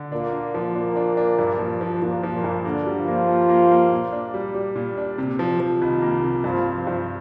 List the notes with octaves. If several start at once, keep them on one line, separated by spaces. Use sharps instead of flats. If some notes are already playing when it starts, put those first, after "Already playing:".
Already playing: D3
A#2 A#3 D4
D4
F3
A#2 A#3 D4
D4
D4
G2
F3
F3
A#2 F3 A#3
F3
A#2 A#3
G2
D3 A#3 D4
G3
F3 F4
A#3
A#3
A#3
A#3
A#2
D4
G3
G3
A#2
D4
C3
F3
F3
C2 D#3 D#4
A#3
C3
G2 F3 F4
C4
F3 F4
G2